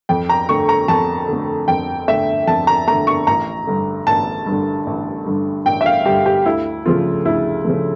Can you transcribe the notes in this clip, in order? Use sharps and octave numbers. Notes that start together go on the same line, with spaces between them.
F2 G5
A#5
D3 A3 C#6
A#5
F2 A5
D3 A3
F2 G5
D3 A3 E5
F2 A5
A#5
D3 A3 A#5
C#6
A1 A#5
G2 D3
A1 A5
G2
D3
A1
G2 D3
A1 G5
E5
F5
G2 D3 G4
G4
D2 E4
C#3 F3 A3 F4
D2 E4
C#3 F3 A3